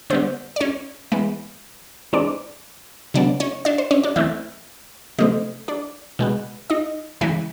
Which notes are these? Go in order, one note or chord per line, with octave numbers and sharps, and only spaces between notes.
D3 G3 B3 C5
D5
C#4 C#5
E3 G#3 B3
E3 G#3 C4 D4 D5
C#3 F#3 B3 D4 D5
C#4 C#5
D4 D5
C5
C#4 C#5
D4 D5
E3 A3 C4 E4 E5
C3 F3 A3 C4 D#4 D#5
D4 D5
B2 G#3 B3
D#4 D#5
C#3 E3 G#3 E4 E5